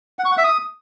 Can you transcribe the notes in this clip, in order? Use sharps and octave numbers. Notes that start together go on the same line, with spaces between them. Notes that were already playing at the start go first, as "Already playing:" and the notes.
F#5
C#6
F#5
E5
D#6